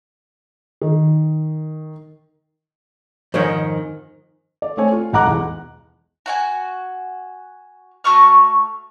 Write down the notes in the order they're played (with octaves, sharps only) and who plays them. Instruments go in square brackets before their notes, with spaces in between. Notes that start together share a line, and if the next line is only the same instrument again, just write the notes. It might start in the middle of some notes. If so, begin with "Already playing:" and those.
[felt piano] D#3
[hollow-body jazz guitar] F2 G#2 D#3 [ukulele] C5 C#5
[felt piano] D5
A3 C4 A4 C#5 G#5
F4
E1 B1 F#5 A#5 D6 F#6
E2
[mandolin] F#4 F#5 G#5
A3 F#4 C#6 F6